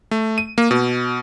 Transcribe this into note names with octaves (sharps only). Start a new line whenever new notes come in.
A3
D#7
A#3
B2